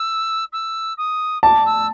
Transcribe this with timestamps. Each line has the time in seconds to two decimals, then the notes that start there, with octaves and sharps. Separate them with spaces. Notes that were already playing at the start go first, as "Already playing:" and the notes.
Already playing: E6
0.52 E6
0.97 D#6
1.43 A5 D6
1.66 E6